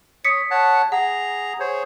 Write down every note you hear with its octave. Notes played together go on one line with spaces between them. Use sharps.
C#5 D#6 B6 C#7
C#5 F#5 A5
G#4 F#5 A#5
G#4 C5 C#5